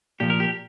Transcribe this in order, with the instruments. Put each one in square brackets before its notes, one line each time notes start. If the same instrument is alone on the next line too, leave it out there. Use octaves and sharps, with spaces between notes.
[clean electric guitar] A#2 F3 G4
A#4
G4